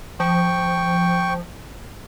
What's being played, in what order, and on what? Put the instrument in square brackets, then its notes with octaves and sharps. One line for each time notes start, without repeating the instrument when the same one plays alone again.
[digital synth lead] F3 [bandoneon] G5 C#6